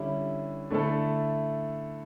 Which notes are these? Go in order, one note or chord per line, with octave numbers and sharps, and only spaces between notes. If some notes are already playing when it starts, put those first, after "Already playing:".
Already playing: D3 G3 C#4 E4
D3 A3 E4 A4